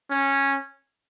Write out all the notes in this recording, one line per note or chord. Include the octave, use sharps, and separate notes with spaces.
C#4